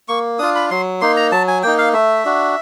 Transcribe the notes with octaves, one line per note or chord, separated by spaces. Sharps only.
A#3 C#6
D4 F4 D#6
B5
F#3 C6
A#3 D#4 C6
A#5
F#3 A5
G#5
A#3 D#4 G5
F5
A3 E5
D4 F#4